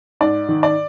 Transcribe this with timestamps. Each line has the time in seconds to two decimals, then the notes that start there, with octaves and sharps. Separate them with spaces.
0.21 G#2 D5
0.49 D#3
0.63 D5